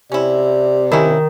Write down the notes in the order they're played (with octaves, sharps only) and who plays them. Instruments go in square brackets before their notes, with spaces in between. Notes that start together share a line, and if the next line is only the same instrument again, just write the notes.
[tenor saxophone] C3 [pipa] C#4 E4 [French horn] D5
[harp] D#3 [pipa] C#4 E4